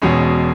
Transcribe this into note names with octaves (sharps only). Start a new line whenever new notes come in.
E1 E2 B2 G#3 C#4